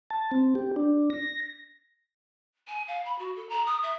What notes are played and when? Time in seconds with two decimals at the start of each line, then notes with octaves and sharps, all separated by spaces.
0.10 A5
0.32 C4
0.55 G4
0.76 D4
1.10 A#6
2.68 G#5
2.88 F5
3.05 B5
3.19 F#4
3.36 A4
3.49 A#5
3.66 D#6
3.83 E5